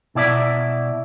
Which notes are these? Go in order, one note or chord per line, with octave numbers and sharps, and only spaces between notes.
B2 E4 D5 E5